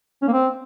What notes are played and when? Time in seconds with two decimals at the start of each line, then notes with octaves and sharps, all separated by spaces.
0.22 C#4
0.28 A#3
0.33 C4